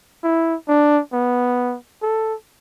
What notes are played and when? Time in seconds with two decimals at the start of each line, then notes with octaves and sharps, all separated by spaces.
0.23 E4
0.68 D4
1.13 B3
2.02 A4